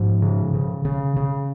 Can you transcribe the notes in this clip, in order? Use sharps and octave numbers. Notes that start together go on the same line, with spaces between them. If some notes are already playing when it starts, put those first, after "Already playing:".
Already playing: G#2 F3
C#3
C#3
C#3
C#3